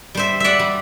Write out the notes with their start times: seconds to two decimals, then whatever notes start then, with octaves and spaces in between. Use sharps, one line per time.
0.15 G3 C5 E5
0.40 D5 E5 F#5
0.59 G3